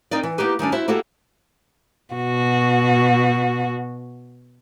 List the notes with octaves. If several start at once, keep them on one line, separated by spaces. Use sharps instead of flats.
C4 D#4 A#4 D5
E3
A#3 B3 D#4 G4 B4
D#3 G3 C#4 D4
E4 F#4 C5 E5
A#3 E4 F#4 G4 A4
B2 F#4